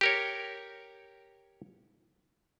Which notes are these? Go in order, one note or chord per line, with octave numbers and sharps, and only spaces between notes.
G4 A#4 C#5